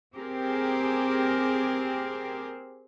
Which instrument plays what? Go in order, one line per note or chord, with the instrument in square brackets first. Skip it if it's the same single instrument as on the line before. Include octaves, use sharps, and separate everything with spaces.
[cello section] C4 G4 G#4 A#4